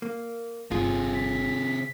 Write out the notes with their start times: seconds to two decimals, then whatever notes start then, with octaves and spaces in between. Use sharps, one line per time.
0.02 A#3
0.72 G1 C3 F4 G#4
1.15 B6